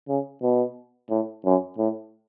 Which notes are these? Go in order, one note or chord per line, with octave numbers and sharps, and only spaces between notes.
C#3
B2
A2
F#2
A2